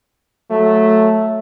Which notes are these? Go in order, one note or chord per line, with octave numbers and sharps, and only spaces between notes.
F#3 A3